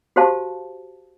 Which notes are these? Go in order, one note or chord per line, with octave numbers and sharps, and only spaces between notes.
F#4 G4 C5 F5 A5